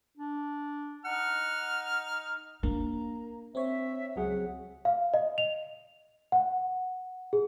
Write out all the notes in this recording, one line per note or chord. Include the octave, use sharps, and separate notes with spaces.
D4
D#4 F#5 F6
A#3 D4 A#5
C4 C#5 E5
C#2 F#3 G#4 F#5
F5
D#5
F7
F#5
G#4